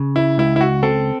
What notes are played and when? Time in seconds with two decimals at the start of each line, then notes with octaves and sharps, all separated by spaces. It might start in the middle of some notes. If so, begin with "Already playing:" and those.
Already playing: C#3
0.16 E4
0.38 C#2 E4
0.56 E4
0.61 F#4
0.83 C4 A4